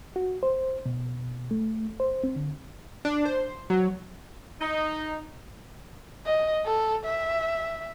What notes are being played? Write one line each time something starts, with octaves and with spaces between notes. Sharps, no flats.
F#4
C5
B2
A3
C5
C4
D3
D4
C5
F#3
D#4
D#5
A4
E5